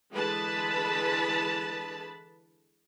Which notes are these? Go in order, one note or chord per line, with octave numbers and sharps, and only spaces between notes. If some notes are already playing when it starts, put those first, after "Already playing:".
D3 E3 G#3 B4 A5 B5